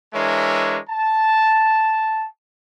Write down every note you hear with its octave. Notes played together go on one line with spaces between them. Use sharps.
E3 G#3 D4 A#4 C#5 E5
A5